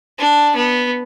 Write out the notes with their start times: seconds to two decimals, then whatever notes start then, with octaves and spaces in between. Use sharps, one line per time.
0.19 D4
0.56 B3